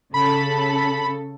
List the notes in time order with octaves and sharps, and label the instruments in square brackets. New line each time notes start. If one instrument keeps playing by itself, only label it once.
[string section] C#3 A4 [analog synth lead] B5